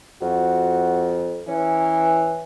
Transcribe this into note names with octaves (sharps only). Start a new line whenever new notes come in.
F2 F#4
E3 C#4